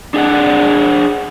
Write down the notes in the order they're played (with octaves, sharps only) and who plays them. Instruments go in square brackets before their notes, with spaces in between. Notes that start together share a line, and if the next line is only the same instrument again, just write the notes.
[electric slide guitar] D4 G#4 D5 F#5